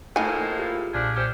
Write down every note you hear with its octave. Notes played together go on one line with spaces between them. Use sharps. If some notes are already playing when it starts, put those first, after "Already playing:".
A2 F3 A3 A#3 D#4 G#5
F6
F4 G4 G#4
B1 A#2 F3 D4 G#4 B6
C#4 G4 C5